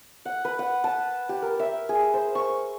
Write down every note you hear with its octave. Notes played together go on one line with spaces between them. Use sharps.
F#5
B4
F#5
A5
G4
A#4
E5
G#4
C5
C#6